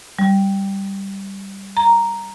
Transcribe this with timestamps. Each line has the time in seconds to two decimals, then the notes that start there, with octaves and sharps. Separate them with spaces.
0.19 G3
1.77 A#5